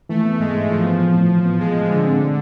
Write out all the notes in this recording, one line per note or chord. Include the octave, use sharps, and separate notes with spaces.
E3 A3
B3
G#2 G#3
G#2
E3 F3
B3
A2
A2
E3
B3
A2 G#3
A2
D3 G#3
C4
A2